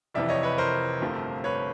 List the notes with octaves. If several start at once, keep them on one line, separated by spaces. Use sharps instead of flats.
F1 F2 C3 E3 D5 E5
C#5 D#5
B4 C#5
A#4 C5
G1 F2 C3 F3 A3
B4 C#5